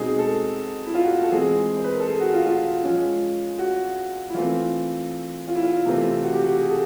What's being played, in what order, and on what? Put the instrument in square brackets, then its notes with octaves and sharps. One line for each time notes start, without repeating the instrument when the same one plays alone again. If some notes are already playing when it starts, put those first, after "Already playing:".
Already playing: [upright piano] B2 G#3 C4 D#4 G#4
A4
E4
F4
F#4
A4
E3 G#3 C4 G#4
C5
B4
A#4
A4
G#4
F#4
F4
F4
F3 G#3 C#4
F#4
E4
E3 A3 C4 F4
F4
E4
F4
C3 E3 A3 C4
F#4
G4
F#4
G#4
A4